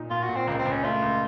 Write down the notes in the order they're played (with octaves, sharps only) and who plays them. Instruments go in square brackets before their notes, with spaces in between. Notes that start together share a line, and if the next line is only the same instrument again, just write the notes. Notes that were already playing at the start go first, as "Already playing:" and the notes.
Already playing: [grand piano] A#2 D#4
[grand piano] A#2 [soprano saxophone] F4
[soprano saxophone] F#4
[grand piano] A#2
[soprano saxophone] C4
[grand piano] C#2 [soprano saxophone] A#3
[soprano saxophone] C4
[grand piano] C#2
[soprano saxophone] C#4
[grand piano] A3 [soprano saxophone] F4
[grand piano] C#2